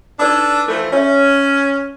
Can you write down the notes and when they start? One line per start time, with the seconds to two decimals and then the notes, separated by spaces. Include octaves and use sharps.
0.19 D4 D#4 A4 B4 D5 D#6
0.68 E3 F3 A3 A4
0.92 C#4 C#5 E5